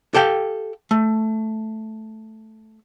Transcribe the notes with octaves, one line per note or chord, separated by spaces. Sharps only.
G4 A4 F5 G5
A3